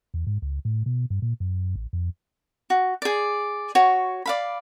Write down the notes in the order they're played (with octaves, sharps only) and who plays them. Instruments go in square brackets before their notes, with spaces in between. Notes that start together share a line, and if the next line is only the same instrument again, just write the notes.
[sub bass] E2
G#2
C#2
A2
B2
G2
A#2
F#2
A1
F2
[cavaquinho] F#4
G#4 D5
F#4 C#5
D5 F5 B5